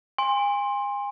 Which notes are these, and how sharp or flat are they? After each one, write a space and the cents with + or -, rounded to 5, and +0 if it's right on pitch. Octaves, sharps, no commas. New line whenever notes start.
G#5 -35 C6 +20